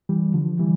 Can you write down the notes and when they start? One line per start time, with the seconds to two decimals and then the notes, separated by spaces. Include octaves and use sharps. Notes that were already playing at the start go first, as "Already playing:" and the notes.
0.09 E3 G3
0.34 D3 F3
0.59 E3 G3